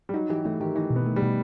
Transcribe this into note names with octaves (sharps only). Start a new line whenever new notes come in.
G3
F#3 D#4
E3 G4
E3 A3
D#3 G4
E3 D#4
B2
B3
A3
G3
B2